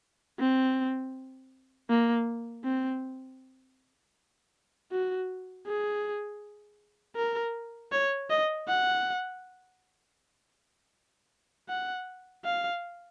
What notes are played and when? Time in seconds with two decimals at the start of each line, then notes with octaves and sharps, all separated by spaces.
0.39 C4
1.89 A#3
2.64 C4
4.92 F#4
5.67 G#4
7.16 A#4
7.92 C#5
8.30 D#5
8.68 F#5
11.69 F#5
12.45 F5